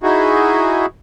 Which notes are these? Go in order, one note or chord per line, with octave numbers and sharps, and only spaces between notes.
D#4 E4 F#4 G#4